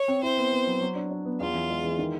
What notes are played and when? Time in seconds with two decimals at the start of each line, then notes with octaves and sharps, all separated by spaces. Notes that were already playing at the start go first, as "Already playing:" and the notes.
Already playing: C#5
0.08 C4
0.23 E4 C5
0.38 B3
0.53 B3
0.67 F#3
0.81 F#3
0.95 D4
1.11 D4
1.25 B3
1.40 E2 F4
1.55 E3
1.70 G#3
1.84 E3
1.98 D#3